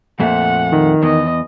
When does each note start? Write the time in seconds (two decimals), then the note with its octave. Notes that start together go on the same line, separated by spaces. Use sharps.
0.20 F2 A#2 A3 F#5
0.72 D#3
1.03 E2 D#5